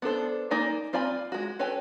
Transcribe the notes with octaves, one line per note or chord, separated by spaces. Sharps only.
B3 D4 A4 C5
A#3 D#4 D5 G#5
C4 F4 D5 G#5 B5
G#3 F#4
A4 B4 C#5 G5 G#5